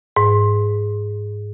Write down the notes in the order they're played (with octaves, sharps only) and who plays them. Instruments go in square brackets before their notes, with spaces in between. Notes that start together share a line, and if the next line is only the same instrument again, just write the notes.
[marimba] G#2